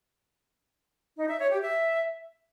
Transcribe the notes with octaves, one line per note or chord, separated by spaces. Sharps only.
D#4
E5
C#5
G4
E5